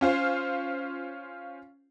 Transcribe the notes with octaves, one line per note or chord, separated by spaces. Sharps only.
C#4 F4 C5 F5